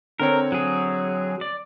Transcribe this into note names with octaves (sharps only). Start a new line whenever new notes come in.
D3 C4 A#4 C#5
F#3 G#4
D5